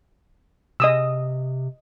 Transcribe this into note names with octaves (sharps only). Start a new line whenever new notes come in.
C3 D#5 D#6 E6